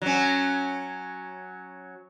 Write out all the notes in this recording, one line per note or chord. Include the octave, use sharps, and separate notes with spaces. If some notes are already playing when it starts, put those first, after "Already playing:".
F#3 C#4